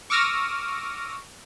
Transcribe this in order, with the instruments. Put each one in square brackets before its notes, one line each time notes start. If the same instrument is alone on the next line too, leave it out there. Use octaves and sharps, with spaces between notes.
[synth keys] C#6 D6 E6 F6 A#6 D#7